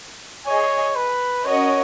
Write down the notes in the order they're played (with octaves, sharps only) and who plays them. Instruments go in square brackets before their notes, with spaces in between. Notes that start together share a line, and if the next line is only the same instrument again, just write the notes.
[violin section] G#4 D#5 G#5 [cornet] C#5
[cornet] B4
[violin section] C#4 F#4 A#4 D#5 [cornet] C#5